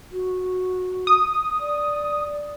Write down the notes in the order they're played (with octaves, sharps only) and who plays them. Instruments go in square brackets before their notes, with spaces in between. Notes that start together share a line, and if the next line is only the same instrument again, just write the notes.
[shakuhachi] F#4
[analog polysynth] D#6
[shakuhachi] D5